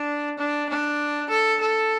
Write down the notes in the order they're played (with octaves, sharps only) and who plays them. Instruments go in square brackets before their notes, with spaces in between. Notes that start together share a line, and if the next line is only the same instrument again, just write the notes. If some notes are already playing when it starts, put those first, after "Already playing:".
Already playing: [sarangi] D4
D4
D4
A4
A4